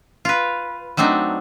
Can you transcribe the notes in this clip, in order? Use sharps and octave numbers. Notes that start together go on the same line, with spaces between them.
F4 B4
F#3 A3 C4 D4 D#4